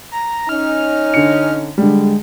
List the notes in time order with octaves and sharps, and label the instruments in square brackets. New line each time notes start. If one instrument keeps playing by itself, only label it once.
[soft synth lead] A#5
[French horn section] C#4 D#4 [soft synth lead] F6
[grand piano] D3 C#7
[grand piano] D3 G3 [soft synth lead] G#3